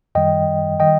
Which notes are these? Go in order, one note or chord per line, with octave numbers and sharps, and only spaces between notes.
F#2 D#3 G3 D#5 G5
D#3 G3 D#5 G5